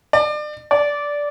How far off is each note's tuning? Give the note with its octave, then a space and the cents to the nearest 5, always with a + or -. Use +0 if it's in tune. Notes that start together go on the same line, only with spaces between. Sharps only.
D5 +35
D5 -10